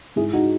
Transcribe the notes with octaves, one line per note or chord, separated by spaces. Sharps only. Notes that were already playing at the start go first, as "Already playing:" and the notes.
G#2 E4 G#4
D#4 F#4